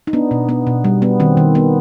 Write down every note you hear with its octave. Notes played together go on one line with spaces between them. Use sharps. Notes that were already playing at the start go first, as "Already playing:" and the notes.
D#4
B3 D4
B2
B3
B2
G3
B3
D#3 C4
D#3
B3